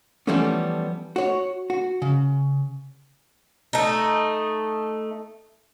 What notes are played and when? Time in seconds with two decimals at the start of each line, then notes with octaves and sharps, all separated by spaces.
0.27 E3 F3 G3 A3 B3 C#4
1.16 F#4 C#5
1.70 F#4
2.02 C#3
3.73 A3 D#4